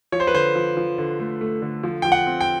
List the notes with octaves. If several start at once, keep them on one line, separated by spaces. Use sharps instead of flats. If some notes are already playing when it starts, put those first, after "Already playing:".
F3 C#5
C5
B4
D3 C5
F3
F3
D3
A3
A3
D3
F3
F3 G5
F#5
C4
G5